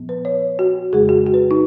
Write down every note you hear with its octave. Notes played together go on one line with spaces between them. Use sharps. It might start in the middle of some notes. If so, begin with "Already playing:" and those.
Already playing: A#2 F3 B3
B4
C#5
F#4
F2 C#3 G#3 G#4
F#4
F#4
B4
D#4